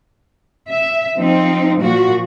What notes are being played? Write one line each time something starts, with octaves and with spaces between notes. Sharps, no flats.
E5
F3 C4 D#4
A#2 F3 F#4